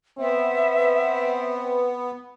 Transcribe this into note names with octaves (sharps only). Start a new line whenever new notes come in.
B3 C4 E5